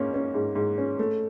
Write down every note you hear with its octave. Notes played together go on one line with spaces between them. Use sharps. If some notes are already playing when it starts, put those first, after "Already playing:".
Already playing: G#2 A#3 C#4
C#4
G#2
G#2
C#4
A3